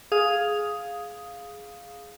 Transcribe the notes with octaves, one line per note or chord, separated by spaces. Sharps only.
G#4 F5 D#6